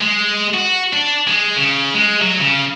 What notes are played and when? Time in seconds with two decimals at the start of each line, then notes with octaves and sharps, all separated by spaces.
0.01 G#3
0.54 F#4
0.93 D4
1.27 G#3
1.56 C#3
1.94 G#3
2.22 F#3
2.41 C#3